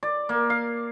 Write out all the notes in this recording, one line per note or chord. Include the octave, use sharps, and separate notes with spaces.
D5
A#3
F5